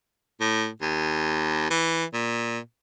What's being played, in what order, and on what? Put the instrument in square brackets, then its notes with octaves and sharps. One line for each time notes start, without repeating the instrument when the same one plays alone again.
[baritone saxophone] A2
D#2
E3
A#2